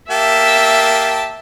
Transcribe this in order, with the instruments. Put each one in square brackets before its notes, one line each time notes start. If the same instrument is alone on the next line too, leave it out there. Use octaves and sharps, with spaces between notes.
[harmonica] A#3 G4 A5 [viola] E5